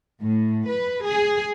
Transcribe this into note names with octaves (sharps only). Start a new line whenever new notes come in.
A2
B4
G#4